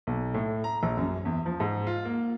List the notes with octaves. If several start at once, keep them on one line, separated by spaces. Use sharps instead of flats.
B1
A2
A#5
A#1
F#2
E2
F3
G#2
F4
A#3